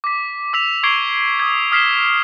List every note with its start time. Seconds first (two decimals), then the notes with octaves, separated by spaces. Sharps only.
0.04 D6 B6
0.53 D6 E6 B6 F7
0.83 C#6 D6 G#6 C7 D7 G7
1.40 D#6 G#6
1.72 D#6 F6 B6 C7 E7 G7